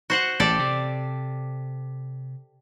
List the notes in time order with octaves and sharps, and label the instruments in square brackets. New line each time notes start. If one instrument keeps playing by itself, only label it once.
[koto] F#4 C5 F#5
[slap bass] A1 [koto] G4 A4 D5
[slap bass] C3